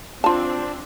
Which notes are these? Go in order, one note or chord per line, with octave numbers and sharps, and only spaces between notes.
C4 D4 F4 A5